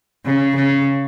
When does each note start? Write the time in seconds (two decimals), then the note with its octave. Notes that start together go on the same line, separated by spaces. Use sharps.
0.25 C#3
0.55 C#3